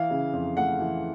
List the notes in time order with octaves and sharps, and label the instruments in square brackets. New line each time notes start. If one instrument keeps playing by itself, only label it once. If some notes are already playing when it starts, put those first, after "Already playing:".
Already playing: [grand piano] E3 F5
C#3
F2
A3 F#5
E3